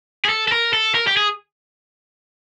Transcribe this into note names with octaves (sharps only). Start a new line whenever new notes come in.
G#4
A4
A4
A#4
A4
A#4
G4
G#4